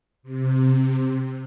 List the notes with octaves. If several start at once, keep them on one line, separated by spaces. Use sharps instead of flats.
C3